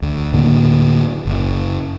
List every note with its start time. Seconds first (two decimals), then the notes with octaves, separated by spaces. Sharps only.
0.02 D2
0.33 A2 D3 A#3
1.25 F#1